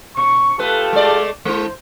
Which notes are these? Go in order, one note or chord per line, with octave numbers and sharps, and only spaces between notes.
B2 C#6
A3 F4 G4 A4 B4
G#3 A3 D5
G#3 E4 C5